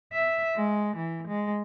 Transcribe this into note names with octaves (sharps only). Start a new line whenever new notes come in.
E5
G#3
E3
G#3